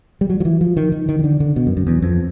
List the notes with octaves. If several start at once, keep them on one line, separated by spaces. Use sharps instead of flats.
G3
F#3
F3
E3
F3
D#3
D#3
D#3
D#3
D3
D3
B2
F#2
F#2
E2
F2